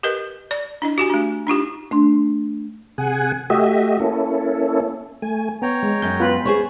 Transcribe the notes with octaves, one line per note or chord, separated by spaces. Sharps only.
G4 A#4 B4 D#5
D5
D4 E4 D#5
F#4 G4 G#5
A3 D4
D4 D#4 F4 G4
A3 D4 C6
C3 G#4 F#5 G#5
A3 F#4 G4 D#5 E5
A#3 C#4 E4 A4
A3 G#5
B3 C#5 G5 A#5
G#3
F#2 G6
B3 F4 B4
G#4 C5 C#5